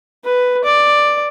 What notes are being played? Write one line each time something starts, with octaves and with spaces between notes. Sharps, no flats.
B4
D5